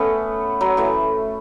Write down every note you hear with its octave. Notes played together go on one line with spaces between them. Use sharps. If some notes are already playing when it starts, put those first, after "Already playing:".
Already playing: A3 B3 C#4
F#3
E3 A3